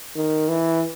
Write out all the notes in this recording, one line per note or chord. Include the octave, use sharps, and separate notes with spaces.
D#3
E3